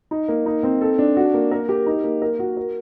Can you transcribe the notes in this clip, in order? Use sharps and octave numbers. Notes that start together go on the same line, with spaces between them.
D#4
A#3
D#4
C4
A4
D4
F#4
A#3
A#4
G4
D#4
A#3
A#4
F#4
A#4